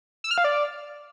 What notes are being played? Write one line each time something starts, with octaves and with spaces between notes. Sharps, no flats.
E6
F6
F5
D5